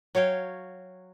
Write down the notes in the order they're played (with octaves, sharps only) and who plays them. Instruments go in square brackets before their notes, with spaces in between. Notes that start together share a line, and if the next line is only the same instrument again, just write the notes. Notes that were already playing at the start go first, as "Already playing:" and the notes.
[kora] F#3 C#5 F5 G5